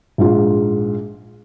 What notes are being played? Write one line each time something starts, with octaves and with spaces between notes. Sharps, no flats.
A#1 G#2 F4